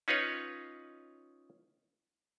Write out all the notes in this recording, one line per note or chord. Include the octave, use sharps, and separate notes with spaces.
C#4 D#4 F4 B4 C#5